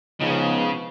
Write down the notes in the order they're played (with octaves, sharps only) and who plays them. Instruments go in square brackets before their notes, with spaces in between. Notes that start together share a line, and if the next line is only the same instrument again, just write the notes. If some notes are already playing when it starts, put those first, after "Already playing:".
[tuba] C#2 [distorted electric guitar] C#3 [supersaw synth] F3 B3 [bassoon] D#4